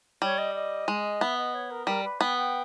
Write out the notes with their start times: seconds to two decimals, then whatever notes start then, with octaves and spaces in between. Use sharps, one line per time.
0.22 G3 C#5
0.38 D#5
0.55 D#5
0.88 G#3
1.21 B3 E5
1.37 D#5
1.54 C#5
1.70 A#4
1.87 G3 A#4
2.04 B4
2.20 B3 G5
2.37 G5